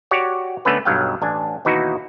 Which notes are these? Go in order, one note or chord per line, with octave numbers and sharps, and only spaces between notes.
F#4 G4 C#5 D5 F#5
D3 A3 B3 C#4 B4
B1 G2 F#3 F5 G5
A1 D4 G#5
D#2 B2 E3 D#4 E4 F#4